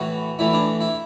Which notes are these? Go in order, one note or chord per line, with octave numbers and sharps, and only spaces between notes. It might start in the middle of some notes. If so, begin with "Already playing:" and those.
Already playing: A2 E3 F#4
A2 E3 E4
D4
E4